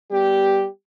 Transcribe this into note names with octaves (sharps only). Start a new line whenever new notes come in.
G3 B3 G4